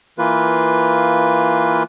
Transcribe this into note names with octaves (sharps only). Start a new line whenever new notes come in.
E3 A#3 F4 B4